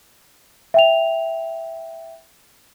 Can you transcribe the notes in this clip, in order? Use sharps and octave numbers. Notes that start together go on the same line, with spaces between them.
E5 G5 F7